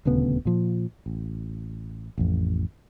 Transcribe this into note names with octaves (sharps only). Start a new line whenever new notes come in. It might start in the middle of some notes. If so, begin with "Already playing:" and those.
D#1 D2 C#3 B3
A#2 F3
A1
A1 F2